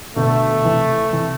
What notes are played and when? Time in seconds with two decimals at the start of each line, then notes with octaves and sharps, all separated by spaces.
0.16 B2 D3 A3
0.65 C3 E3
1.13 C3 E3